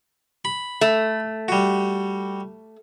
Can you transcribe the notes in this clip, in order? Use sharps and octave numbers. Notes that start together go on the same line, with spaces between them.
B5
A3
G3 F#4